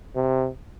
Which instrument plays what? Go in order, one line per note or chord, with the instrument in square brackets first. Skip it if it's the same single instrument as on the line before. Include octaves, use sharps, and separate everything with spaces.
[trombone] C3